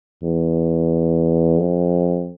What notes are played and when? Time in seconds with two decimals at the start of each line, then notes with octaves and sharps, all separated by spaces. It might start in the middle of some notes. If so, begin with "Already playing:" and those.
0.23 E2
1.59 F2